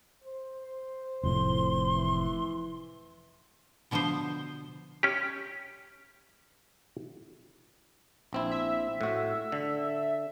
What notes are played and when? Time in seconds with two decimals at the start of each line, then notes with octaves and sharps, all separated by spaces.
0.24 C5
1.24 F1 F2 A2 C6
1.96 E3
3.91 B2 D3 F3 B3 C5
5.03 C#4 G4
8.33 A#1 C4 E4
8.51 E5
9.01 A2 F#4
9.52 D3